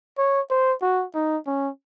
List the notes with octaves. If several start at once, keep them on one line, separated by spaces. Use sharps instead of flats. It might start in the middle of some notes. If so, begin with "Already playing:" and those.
C#5
C5
F#4
D#4
C#4